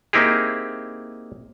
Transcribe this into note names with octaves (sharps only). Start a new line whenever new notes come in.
A#3 C4 D#4 E4 G4 G#4